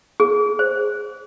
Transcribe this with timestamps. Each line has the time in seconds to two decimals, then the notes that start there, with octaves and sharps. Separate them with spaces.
0.20 G#4
0.59 C5